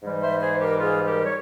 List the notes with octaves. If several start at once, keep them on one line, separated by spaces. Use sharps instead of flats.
G#2 E3 G3
C5 E5
G#4 C5
G4 A#4
F4 G#4
G4 A#4
C#5